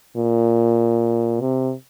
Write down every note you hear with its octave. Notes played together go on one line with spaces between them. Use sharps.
A#2
C3